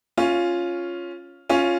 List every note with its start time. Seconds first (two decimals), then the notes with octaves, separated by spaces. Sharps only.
0.17 C#4 F4
1.49 C#4 F4